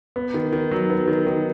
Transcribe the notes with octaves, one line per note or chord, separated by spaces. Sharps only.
B3
D#3
D#3
F#3
B3
D#3
D#3